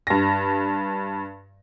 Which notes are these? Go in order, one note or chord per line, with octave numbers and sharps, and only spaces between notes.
G2 A#6